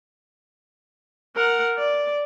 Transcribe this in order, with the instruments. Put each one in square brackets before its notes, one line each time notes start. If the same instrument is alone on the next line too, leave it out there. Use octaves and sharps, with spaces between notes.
[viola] A#4 F#5
D5